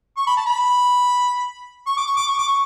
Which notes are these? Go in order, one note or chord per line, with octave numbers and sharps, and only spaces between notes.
C#6
B5
A5
B5
C#6
D6
C#6
D6
C#6
D6
C#6